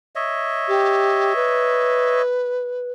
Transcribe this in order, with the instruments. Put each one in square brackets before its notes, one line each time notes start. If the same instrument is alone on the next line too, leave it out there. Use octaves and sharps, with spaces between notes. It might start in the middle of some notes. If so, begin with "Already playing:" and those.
[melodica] C#5 D#5 E5
[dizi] G4
B4